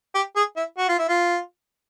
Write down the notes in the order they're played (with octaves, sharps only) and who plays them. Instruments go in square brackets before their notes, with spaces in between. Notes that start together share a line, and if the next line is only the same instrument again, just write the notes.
[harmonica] G4
G#4
E4
F#4
F4
E4
F4